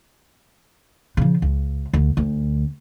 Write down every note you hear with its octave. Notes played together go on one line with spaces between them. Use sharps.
C#3 F3
C#2
D2
D2